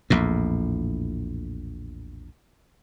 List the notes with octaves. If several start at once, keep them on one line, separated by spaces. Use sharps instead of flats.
A#1 E2 A2